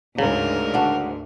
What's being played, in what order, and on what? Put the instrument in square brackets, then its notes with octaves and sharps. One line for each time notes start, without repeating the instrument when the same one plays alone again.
[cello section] D2 G#2 [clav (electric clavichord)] C#3 [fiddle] A#4
[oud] D4 F#4